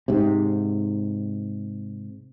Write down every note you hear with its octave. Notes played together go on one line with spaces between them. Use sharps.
G#2 C3